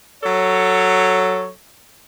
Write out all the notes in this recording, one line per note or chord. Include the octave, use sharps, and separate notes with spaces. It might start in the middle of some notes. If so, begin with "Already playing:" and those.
F#3 A4 C#5